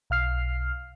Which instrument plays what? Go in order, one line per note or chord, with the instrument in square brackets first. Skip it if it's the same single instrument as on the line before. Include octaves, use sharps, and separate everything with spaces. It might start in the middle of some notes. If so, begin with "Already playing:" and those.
[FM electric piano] B1 F5 F6 C7